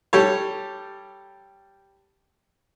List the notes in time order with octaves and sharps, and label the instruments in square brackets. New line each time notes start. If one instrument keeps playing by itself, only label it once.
[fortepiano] G3 G4 A4 C#5